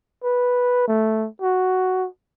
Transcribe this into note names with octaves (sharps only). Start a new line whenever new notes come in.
B4
A3
F#4